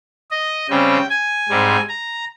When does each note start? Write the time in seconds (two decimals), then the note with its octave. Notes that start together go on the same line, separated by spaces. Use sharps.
0.31 D#5
0.70 C#3 G3 C4 G5
1.10 G#5
1.49 G#2 G3 C4
1.89 A#5